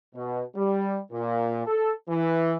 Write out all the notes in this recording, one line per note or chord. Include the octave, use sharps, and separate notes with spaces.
B2
G3
A#2
A4
E3